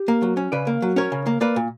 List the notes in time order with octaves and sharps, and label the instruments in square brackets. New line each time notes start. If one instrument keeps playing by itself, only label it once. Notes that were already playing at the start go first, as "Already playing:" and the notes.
Already playing: [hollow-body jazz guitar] G4
A#3
F#3
C#4
C#3 B4 D5
A#3
F#3
C#4 A#4 C#5
C#3
A#3
A#3 B4 D5
A#2